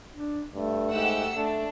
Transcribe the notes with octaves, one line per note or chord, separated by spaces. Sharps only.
D4
G2 A3
G#2 G4 F#5 E6
A3 D4